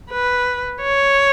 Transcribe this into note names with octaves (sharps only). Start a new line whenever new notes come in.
B4
C#5